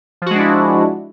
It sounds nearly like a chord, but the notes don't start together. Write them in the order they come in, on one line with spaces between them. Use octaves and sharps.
F3 F#4 G#3 D4 E4